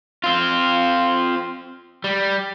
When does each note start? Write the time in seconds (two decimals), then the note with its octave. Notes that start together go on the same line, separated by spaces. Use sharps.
0.24 C4 F4
2.04 G3